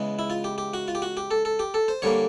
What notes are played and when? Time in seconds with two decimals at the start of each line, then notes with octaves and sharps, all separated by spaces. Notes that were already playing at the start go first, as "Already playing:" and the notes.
Already playing: C#3 E3 G#3 B3
0.19 E4
0.30 F4
0.44 G4
0.58 G4
0.74 F#4
0.88 F4
0.95 G4
1.02 F#4
1.17 G4
1.31 A4
1.45 A4
1.59 G4
1.74 A4
1.88 C5
2.02 D3 G3 A#3 C#5